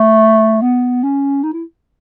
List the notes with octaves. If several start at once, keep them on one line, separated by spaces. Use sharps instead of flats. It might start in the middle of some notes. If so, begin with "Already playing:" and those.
Already playing: A3
B3
C#4
D#4
E4